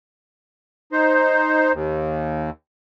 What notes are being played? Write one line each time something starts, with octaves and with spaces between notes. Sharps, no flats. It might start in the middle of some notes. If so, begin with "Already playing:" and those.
D#4 C5
D#2